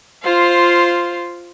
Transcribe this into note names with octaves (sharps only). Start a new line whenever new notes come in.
F4 C5 F5